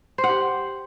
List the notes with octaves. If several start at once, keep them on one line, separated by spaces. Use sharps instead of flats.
C5
F#5
G4